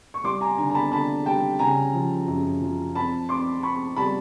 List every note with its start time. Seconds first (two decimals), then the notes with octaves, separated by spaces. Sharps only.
0.14 C#6
0.24 G3 C6 D6
0.41 G#5 A#5
0.58 D3 G#5 A#5
0.70 A#5
0.75 A5 B5
0.92 D3 A5 B5
1.26 G3 G5 A5
1.59 C#3 G#5 A#5
1.94 F3
2.28 F#2
2.61 F3
2.95 C4 A5 B5
3.29 C4 C6 D6
3.63 C4 B5 C#6
3.97 G3 A5 B5